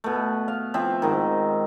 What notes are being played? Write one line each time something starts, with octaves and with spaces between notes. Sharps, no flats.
B2 A3
F5
F3 C4 E5
G#2 D#3